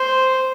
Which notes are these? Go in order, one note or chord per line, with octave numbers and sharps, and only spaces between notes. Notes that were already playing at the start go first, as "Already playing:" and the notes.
Already playing: C5